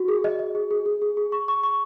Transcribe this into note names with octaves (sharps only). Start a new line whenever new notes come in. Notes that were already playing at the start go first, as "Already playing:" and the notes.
Already playing: F#4
G#4
D#5
D#5
G#4
G#4
G#4
G#4
G#4
C#6
C#6
C#6